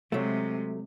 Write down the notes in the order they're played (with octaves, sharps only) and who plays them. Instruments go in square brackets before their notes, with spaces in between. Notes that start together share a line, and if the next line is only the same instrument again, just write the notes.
[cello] C3 G#3 [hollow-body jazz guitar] F#3 A3